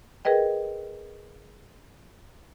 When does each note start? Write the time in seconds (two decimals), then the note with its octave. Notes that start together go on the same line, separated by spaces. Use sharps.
0.25 G#4 A#4 B4 D#5 G5